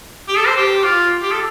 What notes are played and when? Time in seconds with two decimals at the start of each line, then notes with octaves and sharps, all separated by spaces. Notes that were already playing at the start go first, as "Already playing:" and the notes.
0.29 G4
0.37 A4
0.47 C5
0.57 G4
0.84 F4
1.22 G4
1.31 A4